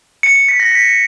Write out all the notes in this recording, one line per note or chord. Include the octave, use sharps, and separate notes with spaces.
C#7
C#7
B6
A#6
B6